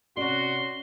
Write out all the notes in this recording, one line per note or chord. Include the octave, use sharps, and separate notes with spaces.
C3 C#4 F#4 D5 C6